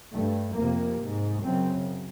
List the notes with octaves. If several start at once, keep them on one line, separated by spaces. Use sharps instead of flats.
G2 A3
F2 C3 A#3
G#2
F#2 C#3 C4